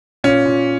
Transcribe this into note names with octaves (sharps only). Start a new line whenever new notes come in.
A#2 C#4
A#2